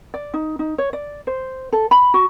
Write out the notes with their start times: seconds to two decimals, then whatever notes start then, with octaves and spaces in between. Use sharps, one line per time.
0.14 D5
0.34 D#4
0.59 D#4
0.78 C#5
0.93 D5
1.27 C5
1.73 A4
1.91 B5
2.14 F#4